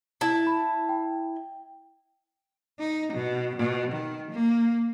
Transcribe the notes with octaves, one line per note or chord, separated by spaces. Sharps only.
E4 A5
B5
G5
D#4
B2
B2
D#3
A#3